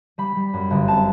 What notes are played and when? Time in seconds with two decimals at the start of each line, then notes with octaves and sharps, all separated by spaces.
0.18 G3 B5
0.36 G3
0.53 F#2
0.71 G1
0.88 C4 A5